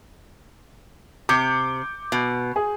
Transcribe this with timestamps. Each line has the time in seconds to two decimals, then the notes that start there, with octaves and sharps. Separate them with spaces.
1.29 C3 D6 G6 C#7
2.12 B2
2.56 G#4